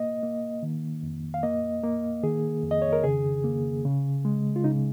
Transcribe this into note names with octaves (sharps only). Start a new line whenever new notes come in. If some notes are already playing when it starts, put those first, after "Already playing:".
Already playing: A#3 D#5
A#3
D#3
F2
F5
A#3 D#5
A#3
D#3 G#4
F2
D#5
C#5
A#4
C#3 G#4
A#3
C#3
G#3
F4
C#3 D#4